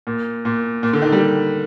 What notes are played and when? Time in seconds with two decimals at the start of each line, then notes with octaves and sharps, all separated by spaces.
0.07 A#2
0.45 A#2
0.83 A#2
0.93 D3
1.02 D#3
1.12 G3